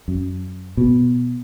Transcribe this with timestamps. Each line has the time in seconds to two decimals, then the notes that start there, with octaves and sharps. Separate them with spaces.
0.08 F#2
0.77 B2